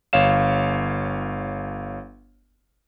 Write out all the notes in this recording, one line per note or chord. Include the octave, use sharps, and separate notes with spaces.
G1 C#5 F5 E7